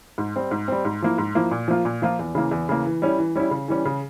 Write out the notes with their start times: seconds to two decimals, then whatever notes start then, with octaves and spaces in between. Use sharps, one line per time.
0.18 G#2
0.36 G3 C4
0.51 G#2
0.68 G3 C4
0.85 G#2
1.02 F3 A#3 E4
1.18 G#2
1.35 F3 A#3 E4
1.51 A#2
1.68 F3 A#3 F4
1.85 A#2
2.02 F3 A#3 F4
2.19 E2
2.35 C#3 E3 A#3
2.51 E2
2.69 C#3 E3 A#3
2.85 E3
3.02 G3 C#4 E4
3.18 E3
3.35 G3 C#4 E4
3.51 C#3
3.68 E3 G3 C#4
3.85 C#3